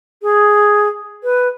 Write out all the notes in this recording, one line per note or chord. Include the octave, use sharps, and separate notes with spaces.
G#4
B4